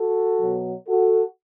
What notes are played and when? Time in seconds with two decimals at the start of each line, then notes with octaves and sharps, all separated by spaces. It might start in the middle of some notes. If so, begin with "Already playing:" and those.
Already playing: F#4 A4
0.40 B2 F#3
0.88 F#4 A4